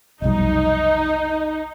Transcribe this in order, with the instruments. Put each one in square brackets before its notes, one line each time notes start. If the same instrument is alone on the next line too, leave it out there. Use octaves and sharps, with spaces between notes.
[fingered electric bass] F1 B1 G3 [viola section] D#4 [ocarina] D#5